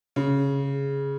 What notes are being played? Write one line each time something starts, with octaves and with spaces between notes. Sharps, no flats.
C#3